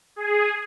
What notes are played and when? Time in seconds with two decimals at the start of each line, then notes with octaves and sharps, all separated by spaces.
0.16 G#4